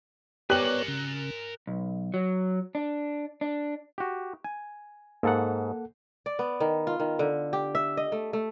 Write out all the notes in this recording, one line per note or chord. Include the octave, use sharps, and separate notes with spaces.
B3 G4 A#4 C#5 D5 G#5 F#6 F#7
C#3
B1
F#3
D4
D4
F#4 G4
G#5
G#2 A#3 A4 F#5
D5
B3
D#3
F4
D#3
D3
G4
E5
D#5
A3
A3